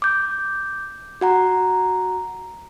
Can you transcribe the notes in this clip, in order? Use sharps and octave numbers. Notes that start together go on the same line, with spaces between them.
D6 G6
F#4 F#5 A#5